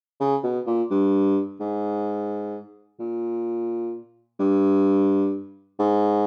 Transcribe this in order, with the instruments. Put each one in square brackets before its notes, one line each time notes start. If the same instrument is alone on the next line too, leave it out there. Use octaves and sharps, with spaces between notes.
[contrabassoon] C#3
B2
A#2
G2
G#2
A#2
G2
G#2